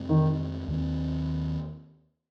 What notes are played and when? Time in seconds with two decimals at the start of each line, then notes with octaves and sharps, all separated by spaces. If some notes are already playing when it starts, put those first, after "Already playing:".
Already playing: F2 C3 G#3 C4
0.09 D#3
0.68 D#2 D#3 G#3 C4